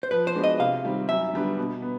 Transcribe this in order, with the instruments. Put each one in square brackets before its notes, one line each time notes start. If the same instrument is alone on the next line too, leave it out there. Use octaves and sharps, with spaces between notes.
[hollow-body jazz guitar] C5
[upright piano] F3 [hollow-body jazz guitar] B4
[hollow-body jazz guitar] C5
[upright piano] G#3 B3 D4 F#4
[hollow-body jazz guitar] D#5
[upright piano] C3 [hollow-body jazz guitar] F5
[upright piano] D#3 G3 C4
[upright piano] F#2 [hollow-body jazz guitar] E5
[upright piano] D3 G3 B3 D4
B2
B3